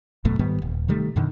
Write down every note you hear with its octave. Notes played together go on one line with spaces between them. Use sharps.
G1 F#2 B2 A3
G#2 D#3 G3 B3
D#1
C3 D#3 G3 A3
F#2 B2 D3 D#3